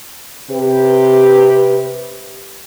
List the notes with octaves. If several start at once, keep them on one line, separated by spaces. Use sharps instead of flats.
C3 G4 B4